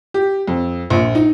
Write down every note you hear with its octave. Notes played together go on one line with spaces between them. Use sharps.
G4
F2
A#1
D#4